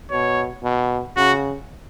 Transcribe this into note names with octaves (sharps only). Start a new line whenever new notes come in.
B2 C#5
B2
C#3 F#4